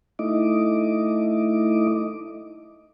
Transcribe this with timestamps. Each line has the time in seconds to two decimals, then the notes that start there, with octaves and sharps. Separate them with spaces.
0.19 A3 D#4 E4 D#5 D6